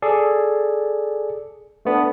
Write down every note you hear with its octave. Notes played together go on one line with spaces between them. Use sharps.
G#4 A4 D5
A3 B3 D4